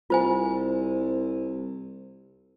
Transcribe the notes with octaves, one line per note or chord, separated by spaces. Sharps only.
C2 F4 C5 G#5